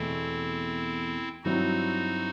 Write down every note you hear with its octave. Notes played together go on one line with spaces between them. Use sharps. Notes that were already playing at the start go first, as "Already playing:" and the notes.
Already playing: E2 B2 A3 C4 E4
G2 F#3 C4 D#4 E4 F#4